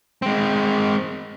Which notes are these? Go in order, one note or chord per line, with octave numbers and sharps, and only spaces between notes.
G#3 C4